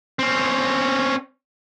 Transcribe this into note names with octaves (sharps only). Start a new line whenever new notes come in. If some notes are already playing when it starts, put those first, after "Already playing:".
C4 C#4